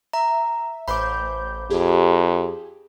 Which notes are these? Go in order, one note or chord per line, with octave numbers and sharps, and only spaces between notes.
E5 A#5
A1 C5 B5 D6 G6
F2 G4 G#4